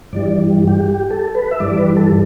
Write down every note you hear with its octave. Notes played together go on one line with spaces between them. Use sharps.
G2 E3 G3 D5
G4
G4
A4
B4
E5
G2 E3 G3 D5
B4
A4